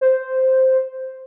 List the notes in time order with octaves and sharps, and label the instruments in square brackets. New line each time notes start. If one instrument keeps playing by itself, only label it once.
[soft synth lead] C5